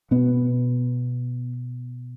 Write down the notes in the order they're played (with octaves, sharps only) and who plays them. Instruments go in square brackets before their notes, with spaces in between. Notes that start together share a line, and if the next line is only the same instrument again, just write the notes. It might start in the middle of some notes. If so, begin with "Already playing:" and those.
[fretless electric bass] B2 B3